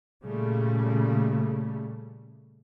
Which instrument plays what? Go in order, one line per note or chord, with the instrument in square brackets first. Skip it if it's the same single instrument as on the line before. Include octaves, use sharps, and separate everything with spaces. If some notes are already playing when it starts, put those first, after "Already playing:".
[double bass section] A#2 C#3 G3 A3